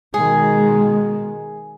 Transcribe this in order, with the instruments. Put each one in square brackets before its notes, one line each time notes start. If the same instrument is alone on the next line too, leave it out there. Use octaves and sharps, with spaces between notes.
[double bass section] B2 D#3 G#3 [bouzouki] G#4 [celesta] G#5